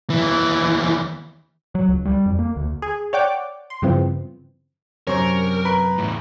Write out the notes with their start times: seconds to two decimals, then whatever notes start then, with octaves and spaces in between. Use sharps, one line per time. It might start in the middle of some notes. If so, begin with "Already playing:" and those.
0.10 D#2 E3
1.75 F#3
1.88 C#2
2.05 G3
2.25 F2
2.39 A#3
2.56 D2
2.82 G#4
3.13 C#5 D5 F#5 G5 D6
3.70 C6
3.82 G2 C#3 E3 F3 B3 C4
5.07 F#2 C3 C4 A#4 C#5 C#6
5.65 B4 A#5 B5
5.98 E2 A2